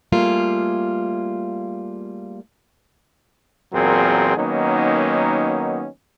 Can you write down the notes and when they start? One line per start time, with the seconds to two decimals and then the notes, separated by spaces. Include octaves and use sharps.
0.12 G3 A3 A#3 F4 G#4 F5
3.73 E2 A#2 F#3 C4 G#4 A#4
4.36 D#3 F#3 A#3 B3 C#4 D#4